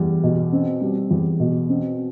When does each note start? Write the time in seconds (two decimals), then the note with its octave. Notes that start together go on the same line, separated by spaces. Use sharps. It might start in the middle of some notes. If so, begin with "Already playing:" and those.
Already playing: E2 G3
0.23 B2
0.52 C4
0.81 G3
1.11 E2
1.40 B2
1.69 C4